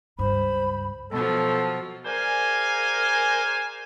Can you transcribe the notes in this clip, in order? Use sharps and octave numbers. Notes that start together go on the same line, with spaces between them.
C#2 G2 C5 B5
B2 F3 F#3 A4
G#4 A#4 C5 D5 F5 G#5